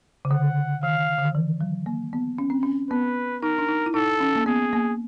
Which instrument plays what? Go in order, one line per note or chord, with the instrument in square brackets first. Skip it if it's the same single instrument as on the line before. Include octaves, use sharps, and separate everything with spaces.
[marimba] C#3
[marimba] D3 [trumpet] F#5
[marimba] D#3 [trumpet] F5
[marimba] D3
D#3
E3
F#3
A#3
B3
C#4
C4
C#4
[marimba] B3 [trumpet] B4
[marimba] D#4 [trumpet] A#4
[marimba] D4
D#4
E4
[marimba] D#4 [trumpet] A4
[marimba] C#4
A#3
[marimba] B3 [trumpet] G#4
[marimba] A#3